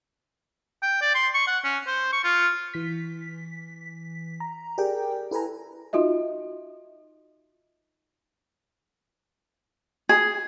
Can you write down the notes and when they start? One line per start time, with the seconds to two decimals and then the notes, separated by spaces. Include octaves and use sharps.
0.83 G5
1.02 D5
1.15 C6
1.34 C#6
1.48 F#5
1.64 C#4
1.87 C5
2.12 C#6
2.24 F4
2.74 E3 B6
4.40 A#5
4.78 G4 G#4 A#4 D5 G5
5.31 E4 A4 B4 G#5 A#5
5.93 D#4 F4 F#4 D#5 E5
10.09 G#4